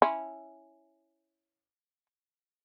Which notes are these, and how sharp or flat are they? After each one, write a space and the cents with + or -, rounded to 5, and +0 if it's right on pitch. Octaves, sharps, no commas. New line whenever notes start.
C#4 +0 E4 -5